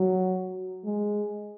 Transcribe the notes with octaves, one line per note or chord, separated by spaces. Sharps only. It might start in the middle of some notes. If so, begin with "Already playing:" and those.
Already playing: F#3
G#3